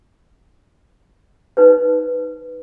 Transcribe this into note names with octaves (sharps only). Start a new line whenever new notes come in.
D#4 B4 C5